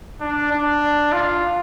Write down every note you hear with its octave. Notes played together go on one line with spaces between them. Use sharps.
D4
D4
F4